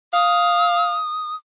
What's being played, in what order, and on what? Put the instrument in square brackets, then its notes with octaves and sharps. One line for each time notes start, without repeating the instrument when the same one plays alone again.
[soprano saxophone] F5 [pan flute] D#6